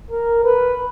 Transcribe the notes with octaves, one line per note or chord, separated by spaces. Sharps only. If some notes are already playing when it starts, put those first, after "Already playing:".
A#4
B4